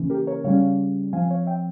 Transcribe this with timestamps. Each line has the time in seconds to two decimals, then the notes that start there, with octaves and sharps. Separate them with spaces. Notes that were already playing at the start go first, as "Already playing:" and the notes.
Already playing: C#3 E3 A#3 C#4
0.10 G4 A#4
0.27 A#4 C#5
0.44 C#3 G3 C#4 C#5 F5
1.13 F3 C4 F5 G#5
1.30 C#5 F5
1.47 E5 G5